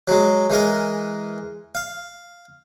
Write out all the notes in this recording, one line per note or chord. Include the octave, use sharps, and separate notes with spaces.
F#3 G#3
E3 G#3 A#4
F5